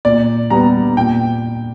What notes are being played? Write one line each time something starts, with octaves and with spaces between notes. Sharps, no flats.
A#2 D5
G3 B3 A#5
A#2 G5